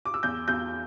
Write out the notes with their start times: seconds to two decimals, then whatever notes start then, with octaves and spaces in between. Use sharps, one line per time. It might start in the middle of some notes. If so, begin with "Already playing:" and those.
0.05 D6
0.14 E6
0.23 E2 G6
0.48 E2 G6